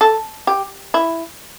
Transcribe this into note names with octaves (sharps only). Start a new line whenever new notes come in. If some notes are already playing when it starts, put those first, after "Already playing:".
A4
G4
E4